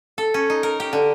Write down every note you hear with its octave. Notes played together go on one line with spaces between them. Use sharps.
A4
C#4
D#4
A#4
G4
D3